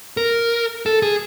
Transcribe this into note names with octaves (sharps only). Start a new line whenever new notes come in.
A#4
A4
G#4